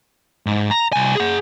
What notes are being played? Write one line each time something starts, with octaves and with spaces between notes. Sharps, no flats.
G#2
A#5
C2 G#5
G#4 F#5